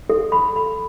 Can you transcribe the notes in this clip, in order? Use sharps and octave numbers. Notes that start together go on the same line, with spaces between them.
A4
B5
B5